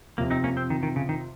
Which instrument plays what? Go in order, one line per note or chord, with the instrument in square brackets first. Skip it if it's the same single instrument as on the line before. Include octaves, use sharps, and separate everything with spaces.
[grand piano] F2 C3 F3 [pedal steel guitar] A#3
[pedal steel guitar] C4 D#4
A#3 C#4
C4
D#3
D#3
C#3
D#3